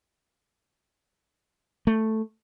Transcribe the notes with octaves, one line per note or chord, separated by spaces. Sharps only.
A3